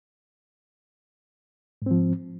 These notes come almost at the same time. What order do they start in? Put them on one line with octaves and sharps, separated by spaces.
G#2 C4 F3